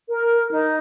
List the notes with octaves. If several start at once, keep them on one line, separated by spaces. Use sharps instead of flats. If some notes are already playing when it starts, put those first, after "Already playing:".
A#4
D#4